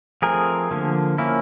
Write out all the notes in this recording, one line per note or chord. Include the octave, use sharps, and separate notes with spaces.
F3 A3 C4 G#4 A#4
D3 F3 A#3
F3 A#3 C#4 E4